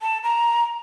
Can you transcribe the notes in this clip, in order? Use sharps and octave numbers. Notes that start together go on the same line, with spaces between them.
A5
A#5